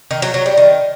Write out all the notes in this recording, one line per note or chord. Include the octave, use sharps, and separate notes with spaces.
D#3
F#3
F#3
G3
D#3